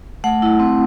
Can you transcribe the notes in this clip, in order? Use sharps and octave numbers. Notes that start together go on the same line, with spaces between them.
A3 F#5
E4
C4